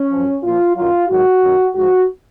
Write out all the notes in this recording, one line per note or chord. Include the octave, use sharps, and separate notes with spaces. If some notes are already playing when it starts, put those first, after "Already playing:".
Already playing: C#4
F#2 F3
A#2 F3 F4
F#2 D#3 F#3 F4
G#2 D#3 F#3 F#4
F#2 D#3 F#3
G#2 F3 F#4